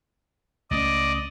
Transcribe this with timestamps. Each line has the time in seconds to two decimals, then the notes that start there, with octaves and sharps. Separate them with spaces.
0.71 C#2 A3 C#4 D5 D#5